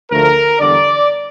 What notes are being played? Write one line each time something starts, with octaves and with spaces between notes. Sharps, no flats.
D2 D3 F3 A3 A#4
E2 D3 G3 D5